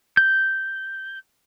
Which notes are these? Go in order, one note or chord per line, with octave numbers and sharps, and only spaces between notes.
G6